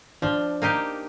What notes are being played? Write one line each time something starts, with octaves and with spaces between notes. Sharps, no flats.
F3 D4
A#3 D#4 G4